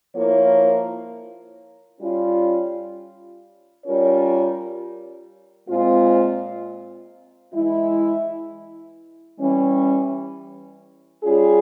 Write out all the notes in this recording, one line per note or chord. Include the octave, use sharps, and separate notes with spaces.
F3 A#3 E4 A#4 C#5
G3 C#4 F4
G3 C#4 F4 A#4 C#5
A#2 G#3 C4 F4
E3 G#3 E4
E3 G3 C#4
G3 C#4 F4 G#4